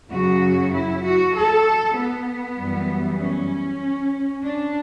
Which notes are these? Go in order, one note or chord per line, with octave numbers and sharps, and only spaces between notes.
F#2 C#3 F#3 F#4
E4
F#4
A4
B3
F#2 E3 G3
C#4
D4